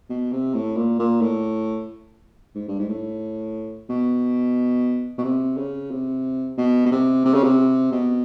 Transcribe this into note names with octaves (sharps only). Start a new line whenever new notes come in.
B2
C3
A2
A#2
A#2
A2
G#2
G2
G#2
A2
B2
B2
C3
C#3
C3
B2
B2
C3
C3
C#3
C3
B2